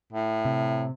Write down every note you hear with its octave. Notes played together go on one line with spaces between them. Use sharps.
A2
C3